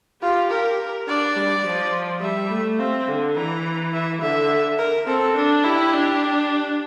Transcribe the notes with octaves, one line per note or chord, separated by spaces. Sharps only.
F4 G4
A#4
D4 D5
G3
F3
G3 E5
A3
C4 F5
D3
E3 A#5
E5
D3 E5
A#4
C4 A4
D4
E4 G4
D4